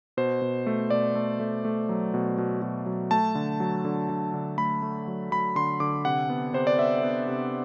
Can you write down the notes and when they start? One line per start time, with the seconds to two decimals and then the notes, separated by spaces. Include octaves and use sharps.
0.17 B2 C5
0.42 B2
0.67 A3
0.90 B2 D5
1.15 A3
1.40 A3
1.65 A3
1.89 F#3
2.14 B2
2.38 B2
2.62 B2
2.86 F#3
3.11 A3 A5
3.35 D3
3.60 F#3
3.85 D3
4.10 D3
4.34 D3
4.58 A3 B5
4.82 A3
5.08 F#3
5.31 F#3 B5
5.55 D3 C6
5.80 D3 D6
6.05 C3 F#5
6.30 B3
6.53 C3 C5
6.67 D5
6.78 B3 E5
7.03 B3
7.28 C3